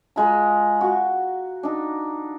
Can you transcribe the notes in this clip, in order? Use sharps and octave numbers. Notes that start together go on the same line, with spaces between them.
G#3 F4 A#5
F#4 C#6
D4 D#4